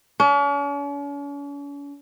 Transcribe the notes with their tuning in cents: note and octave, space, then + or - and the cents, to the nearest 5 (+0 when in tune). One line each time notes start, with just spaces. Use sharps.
C#4 +45